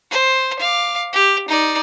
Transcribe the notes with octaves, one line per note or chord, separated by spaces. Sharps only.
C5
F5 D6
G4
D#4 D5